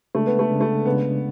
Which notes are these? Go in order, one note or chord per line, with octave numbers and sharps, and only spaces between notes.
C#3 G#3 A3 D4
B3
A3
C#3 G#3 D4
A3
C#3 G#3 B3 D4